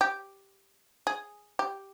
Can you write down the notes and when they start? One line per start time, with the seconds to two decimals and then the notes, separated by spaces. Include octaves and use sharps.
0.01 G4
1.07 G#4
1.59 G4